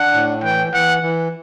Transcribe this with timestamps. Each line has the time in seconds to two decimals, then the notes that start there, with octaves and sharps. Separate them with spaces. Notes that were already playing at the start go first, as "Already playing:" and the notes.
Already playing: D4 F#5
0.14 A2
0.43 E3 G5
0.73 E3 F#5
1.03 E3